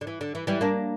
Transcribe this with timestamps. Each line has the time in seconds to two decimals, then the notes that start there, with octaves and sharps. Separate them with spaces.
0.01 D3
0.07 E3
0.21 D3
0.35 E3
0.47 E3 G3
0.61 A#3 D4